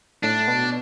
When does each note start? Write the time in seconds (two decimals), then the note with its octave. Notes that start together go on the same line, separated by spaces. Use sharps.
0.23 A2 D4
0.48 B2